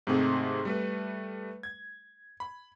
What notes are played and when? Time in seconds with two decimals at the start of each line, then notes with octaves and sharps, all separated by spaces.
0.07 G#2 C3 D#3 A3 C4 G#4
0.65 G3 A3 B4
1.63 G#6
2.40 B5